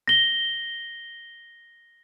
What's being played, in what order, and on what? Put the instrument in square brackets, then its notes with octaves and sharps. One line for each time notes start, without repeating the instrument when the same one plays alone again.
[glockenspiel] A#6 G7